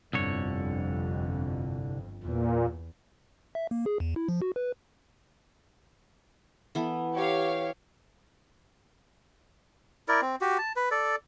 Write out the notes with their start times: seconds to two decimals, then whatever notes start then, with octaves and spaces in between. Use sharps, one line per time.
0.13 G1 C2 F2 D3 C#5
2.23 E2 A#2
3.55 E5
3.71 A#3
3.86 G#4
4.00 E2
4.16 E4
4.29 F3
4.42 F#4
4.56 B4
6.75 E3 B3 A4
7.15 G4 C#5 F5
10.08 E4 A#4 D5
10.22 C4
10.41 F#4 G4
10.58 A5
10.76 B4
10.91 A4 D5